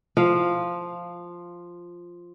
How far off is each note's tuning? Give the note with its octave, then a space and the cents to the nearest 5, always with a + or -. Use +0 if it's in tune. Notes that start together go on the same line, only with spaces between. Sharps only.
F3 +0 F5 -5